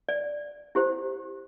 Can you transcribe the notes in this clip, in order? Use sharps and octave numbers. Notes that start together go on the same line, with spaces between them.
D5
E4 G4 C5